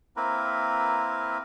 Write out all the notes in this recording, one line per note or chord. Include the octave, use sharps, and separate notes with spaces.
A#3 C4 E4 A#4 B4